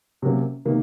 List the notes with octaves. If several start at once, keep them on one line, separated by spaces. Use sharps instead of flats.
C3 F#3 A#3 C#4
C3 D#3 A#3